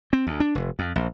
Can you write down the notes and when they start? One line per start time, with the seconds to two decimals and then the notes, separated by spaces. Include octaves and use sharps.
0.13 C4
0.27 D2
0.40 D4
0.55 F1
0.79 F2
0.96 A#1